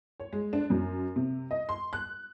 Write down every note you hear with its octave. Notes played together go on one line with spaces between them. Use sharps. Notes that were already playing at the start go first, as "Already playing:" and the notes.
C#5
G#3
D4
F#2
C3
D#5
C6
F#6